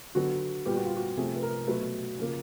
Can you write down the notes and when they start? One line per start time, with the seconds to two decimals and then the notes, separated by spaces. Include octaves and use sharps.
0.15 D3 F#3 B3 F#4
0.66 A#2 G3 B3 G4
0.77 F#4
0.86 F4
0.96 F#4
1.17 C3 F3 A3 G#4
1.36 B4
1.43 A#4
1.67 B2 F#3 A3 B4
2.18 C#3 F3 A#3